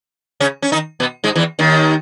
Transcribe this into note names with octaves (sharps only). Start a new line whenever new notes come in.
C#3 C#4
C#4
D#3 D#4
B2 B3
G#2 G#3
E2 E3
D#2 D#3